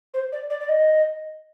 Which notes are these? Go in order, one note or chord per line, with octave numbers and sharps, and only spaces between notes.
C5
D5
D5
D5
D#5